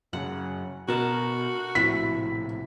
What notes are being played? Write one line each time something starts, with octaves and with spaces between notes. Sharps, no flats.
F#2 C#3 F#5
B2 F#4 A#4 A5
A#1 A2 C3 E4 B6